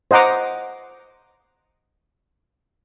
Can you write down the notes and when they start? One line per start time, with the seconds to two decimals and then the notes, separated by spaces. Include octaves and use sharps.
0.11 C5 D#5 F#5 A#5 D6